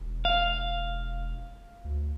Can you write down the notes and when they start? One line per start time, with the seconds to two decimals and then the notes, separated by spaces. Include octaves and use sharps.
0.01 E1
0.25 F5
1.85 D2